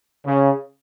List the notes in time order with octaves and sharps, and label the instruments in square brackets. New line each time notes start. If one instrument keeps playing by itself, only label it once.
[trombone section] C#3